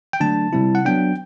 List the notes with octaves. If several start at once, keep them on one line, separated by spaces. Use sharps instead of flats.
G5
D3 F#3 A3 D4 A5
C3 G3 C4 E4
F#5
F#3 B3 D4 G5